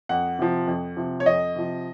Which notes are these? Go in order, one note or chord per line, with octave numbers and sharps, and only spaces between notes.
F2 F#5
C3 F3
F2
C3 F3
C#5
F2 D#5
C3 F3